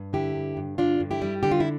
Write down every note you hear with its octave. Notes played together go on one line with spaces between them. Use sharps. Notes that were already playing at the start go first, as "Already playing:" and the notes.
Already playing: G2
D3 E4 G4
G2
G2
D3 D4 F4
G2
E4 G4
G3
D3 G4
F4
E4